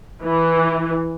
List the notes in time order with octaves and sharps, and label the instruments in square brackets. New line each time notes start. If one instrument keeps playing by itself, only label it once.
[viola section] E3